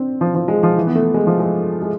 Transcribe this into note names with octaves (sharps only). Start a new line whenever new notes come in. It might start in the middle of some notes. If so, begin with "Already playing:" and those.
Already playing: C4 D4
F3
F3
G#3
F3
E3
B3
A3
G#3
F3
G#3
G#3